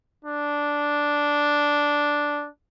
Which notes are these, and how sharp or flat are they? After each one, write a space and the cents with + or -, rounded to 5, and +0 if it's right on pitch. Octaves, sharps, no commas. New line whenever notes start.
D4 -5